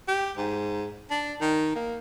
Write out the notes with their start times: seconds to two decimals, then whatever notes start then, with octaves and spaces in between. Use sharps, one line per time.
0.08 G4
0.37 G#2
1.10 D4
1.41 D#3
1.76 A#3